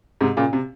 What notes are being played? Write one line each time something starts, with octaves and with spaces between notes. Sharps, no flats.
G#2 C3
A#2 C#3
C3